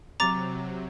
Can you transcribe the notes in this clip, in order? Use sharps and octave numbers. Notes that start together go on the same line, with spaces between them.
C3 F#3 A#5 D6 A6